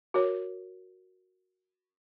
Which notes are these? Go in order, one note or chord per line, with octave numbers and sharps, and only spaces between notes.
F#4 A#4 C#5